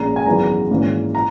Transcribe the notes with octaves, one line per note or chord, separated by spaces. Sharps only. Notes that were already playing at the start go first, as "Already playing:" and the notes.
Already playing: A#1 A#2 G#3 C#4 A#5
G#5
G#1 F#2 E3 G#3 B3 A#5
G#1 G#2 E3 A#3 C#4
A#5